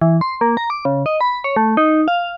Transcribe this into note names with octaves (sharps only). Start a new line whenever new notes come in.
E3
C6
A#3
A#5
D6
C#3
D#5
B5
C#5
A3
D#4
F5